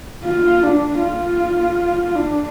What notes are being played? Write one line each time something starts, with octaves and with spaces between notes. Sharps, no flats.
F4
D4
F4
D4